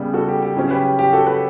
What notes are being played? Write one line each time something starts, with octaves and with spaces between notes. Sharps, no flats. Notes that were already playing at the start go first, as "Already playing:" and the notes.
Already playing: C#3 G3 B3
F#4 A4
G4
G4
C#3 F#3 C#4
G4 B4
G4
G4
F#4 A4
G4 B4